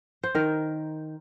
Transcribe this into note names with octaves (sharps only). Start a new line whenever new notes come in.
C5
D#3 A#4